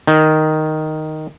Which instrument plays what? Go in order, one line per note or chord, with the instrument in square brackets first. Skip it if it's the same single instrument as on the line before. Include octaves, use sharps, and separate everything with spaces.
[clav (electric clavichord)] D#3